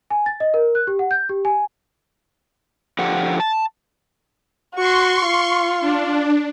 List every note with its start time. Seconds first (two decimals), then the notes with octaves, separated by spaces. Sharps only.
0.10 G#5
0.26 A6
0.40 D#5
0.54 A#4
0.75 F#6
0.87 G4
0.99 F#5
1.11 G6
1.29 G4
1.45 G#5
2.99 D3 F3 G4 F#5
3.40 A5
4.75 F#4 C6 C#6
5.27 F4
5.81 D4